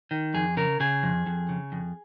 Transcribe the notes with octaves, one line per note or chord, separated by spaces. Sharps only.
D#3
F2 G#4
C#3 A#4
C#3 G#4
F2
F2
C#3
F2